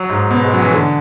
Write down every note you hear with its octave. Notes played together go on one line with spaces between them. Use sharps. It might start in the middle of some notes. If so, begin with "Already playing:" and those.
Already playing: F#3
G#2
B2
G#3
F#3
E3
D3